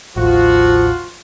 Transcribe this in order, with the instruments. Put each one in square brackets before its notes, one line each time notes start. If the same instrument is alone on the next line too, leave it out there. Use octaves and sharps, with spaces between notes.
[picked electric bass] A1 D#2 [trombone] F3 [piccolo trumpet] F4 [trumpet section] F#4